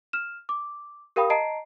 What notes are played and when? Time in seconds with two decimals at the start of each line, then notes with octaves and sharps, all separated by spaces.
0.13 F6 E7
0.49 D6
1.16 G4 A#4 F5 G5 B5 D#6
1.30 D#5 A5 A#5 C7 D7